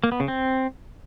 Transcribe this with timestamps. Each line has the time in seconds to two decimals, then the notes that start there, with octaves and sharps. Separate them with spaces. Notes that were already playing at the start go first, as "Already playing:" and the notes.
0.04 A#3
0.12 B3
0.20 C#3
0.28 C4